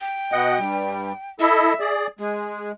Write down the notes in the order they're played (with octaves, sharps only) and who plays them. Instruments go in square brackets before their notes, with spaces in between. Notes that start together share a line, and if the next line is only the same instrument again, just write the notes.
[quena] G5
[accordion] B2 D#5 F#5
G2 G3
[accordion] E4 A4 D#5 [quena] E5
[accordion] G#4 D5
[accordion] G#3 [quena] G#4